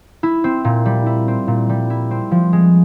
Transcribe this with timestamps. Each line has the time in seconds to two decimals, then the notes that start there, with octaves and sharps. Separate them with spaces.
0.23 E4
0.44 C4
0.65 A#2
0.86 G3
1.06 E4
1.28 C4
1.48 A#2
1.69 G3
1.90 E4
2.11 C4
2.31 F3
2.53 G#3